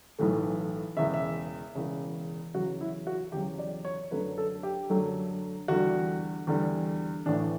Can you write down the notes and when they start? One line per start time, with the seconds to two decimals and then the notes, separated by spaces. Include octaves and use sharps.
0.19 B1 A2 E3 A3
0.97 E1 E2 C#3 E5
1.14 E5
1.75 E1 E2 C#3
2.55 E2 C#3 F#3 F#4
2.81 E4
3.07 F#4
3.32 E2 C#3 F#3 G4
3.59 D5
3.85 C#5
4.11 F#2 D3 F#3 A3 B4
4.38 A4
4.63 G4
4.90 F#2 D3 F#3 A3
5.68 E2 D3 G3 F#4
6.47 E2 D3 G3
7.26 A1 A2 E3 D4